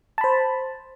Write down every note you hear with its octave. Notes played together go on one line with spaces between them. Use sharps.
C5 A5 B5